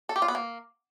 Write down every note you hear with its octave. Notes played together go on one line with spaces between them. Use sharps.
A4
G4
F4
B3
A#3